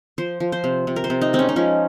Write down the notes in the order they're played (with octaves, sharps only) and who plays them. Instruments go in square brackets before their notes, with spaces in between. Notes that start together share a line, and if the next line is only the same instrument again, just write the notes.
[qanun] F3 C5
F3
C5
C3
C3
A#4
C5
C3
D#4
G#3 C4
C#4
D#4
F3 C#4